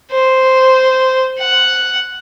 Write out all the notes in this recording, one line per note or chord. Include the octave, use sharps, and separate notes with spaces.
C5
F#5